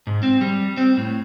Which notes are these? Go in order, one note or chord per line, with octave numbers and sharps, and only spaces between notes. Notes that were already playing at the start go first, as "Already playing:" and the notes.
G#2
C4
G3
C4
A2